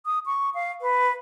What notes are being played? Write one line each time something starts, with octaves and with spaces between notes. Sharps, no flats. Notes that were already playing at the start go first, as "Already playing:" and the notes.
D#6
C#6
F5
B4